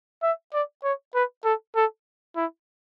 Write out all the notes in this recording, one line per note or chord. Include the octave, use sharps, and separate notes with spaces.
E5
D5
C#5
B4
A4
A4
E4